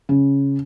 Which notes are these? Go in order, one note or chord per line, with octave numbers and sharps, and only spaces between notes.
C#3